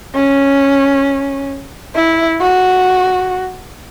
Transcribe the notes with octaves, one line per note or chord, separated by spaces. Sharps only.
C#4
E4
F#4